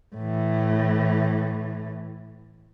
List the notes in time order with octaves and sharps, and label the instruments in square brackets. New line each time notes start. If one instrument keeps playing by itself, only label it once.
[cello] A2 E3